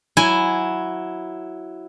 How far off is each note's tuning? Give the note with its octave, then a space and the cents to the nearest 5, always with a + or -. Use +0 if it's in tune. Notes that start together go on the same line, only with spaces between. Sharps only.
F#3 +0 E4 +0 G#5 +0